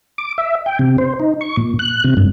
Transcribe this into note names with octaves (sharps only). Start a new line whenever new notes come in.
D6
E5
G5
C3
C5
D#4
C#6
A#2
F#6
C3
G2